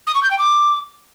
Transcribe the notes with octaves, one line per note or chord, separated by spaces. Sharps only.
D#6
C#6
G6
G5
D6